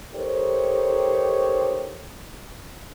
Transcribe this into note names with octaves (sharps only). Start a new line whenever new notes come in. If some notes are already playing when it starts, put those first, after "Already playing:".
D#4 G4 A4 A#4 C5 C#5